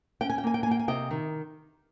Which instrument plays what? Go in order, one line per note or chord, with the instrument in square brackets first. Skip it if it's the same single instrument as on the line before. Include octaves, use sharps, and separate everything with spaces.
[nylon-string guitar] C#4 G5
G#5
G5
A#3 G#5
G5
G#5
A#3
G5
G#5
C3 D#5 G5
D#3